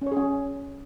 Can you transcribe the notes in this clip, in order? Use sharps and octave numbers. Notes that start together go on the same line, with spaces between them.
C#4
C#5
G#4
C#4